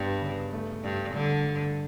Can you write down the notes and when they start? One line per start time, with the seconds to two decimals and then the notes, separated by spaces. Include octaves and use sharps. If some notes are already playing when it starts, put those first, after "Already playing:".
Already playing: G2 B3
0.21 C#3
0.53 A3
0.84 G2 D4
1.15 G2 D3
1.46 G2